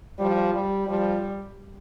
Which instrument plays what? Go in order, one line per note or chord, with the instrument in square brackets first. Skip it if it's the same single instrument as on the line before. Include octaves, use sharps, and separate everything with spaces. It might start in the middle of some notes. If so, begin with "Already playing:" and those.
[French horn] F3 [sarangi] G3
[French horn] G3
[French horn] F3 [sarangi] G3